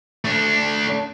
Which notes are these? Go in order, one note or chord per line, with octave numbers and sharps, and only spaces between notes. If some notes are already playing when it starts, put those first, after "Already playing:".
A3 D4